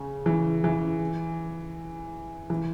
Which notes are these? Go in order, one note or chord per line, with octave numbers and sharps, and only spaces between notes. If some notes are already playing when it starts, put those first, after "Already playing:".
Already playing: C#3
E3
E3
E3